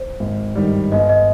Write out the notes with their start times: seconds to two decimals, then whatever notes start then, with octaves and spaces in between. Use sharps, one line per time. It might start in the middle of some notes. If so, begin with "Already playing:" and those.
Already playing: C5
0.20 G#1
0.55 G2 D#3 G3
0.92 G1 D#5
1.09 D#5